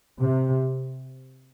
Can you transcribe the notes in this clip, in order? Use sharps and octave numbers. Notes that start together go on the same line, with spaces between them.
C3